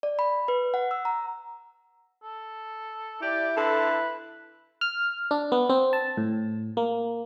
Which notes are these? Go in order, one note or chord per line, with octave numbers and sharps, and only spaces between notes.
D5
B5
B4
F#5
E6
A#5
A4
E4 G4 D5
D3 A4 B4
F6
D4
B3
C4
A5
A2
A#3